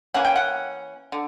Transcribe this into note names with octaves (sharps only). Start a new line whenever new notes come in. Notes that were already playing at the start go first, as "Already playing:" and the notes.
E3 A#3 C#4 F#5
G5
F#5
D3